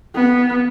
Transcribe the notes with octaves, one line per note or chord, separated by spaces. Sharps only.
B3